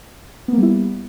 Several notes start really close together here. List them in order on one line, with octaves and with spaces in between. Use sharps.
B3 A#3 G3 E4